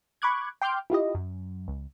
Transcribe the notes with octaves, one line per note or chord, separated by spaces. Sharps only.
B5 C#6 D6 F#6 G#6
G5 C6 D6 F6 G6
E4 F4 G4 D#5
F#2
C#2